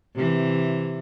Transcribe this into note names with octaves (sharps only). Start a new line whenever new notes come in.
C3 E3